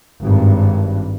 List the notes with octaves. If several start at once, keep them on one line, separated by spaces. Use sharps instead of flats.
G#1 G2